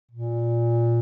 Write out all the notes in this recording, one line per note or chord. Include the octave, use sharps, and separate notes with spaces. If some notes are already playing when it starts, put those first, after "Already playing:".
A#2